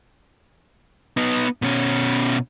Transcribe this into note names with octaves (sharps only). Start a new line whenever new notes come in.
B3 D#4
B2 C#4